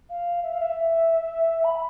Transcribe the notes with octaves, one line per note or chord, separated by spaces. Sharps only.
F5
E5
F5
E5
B5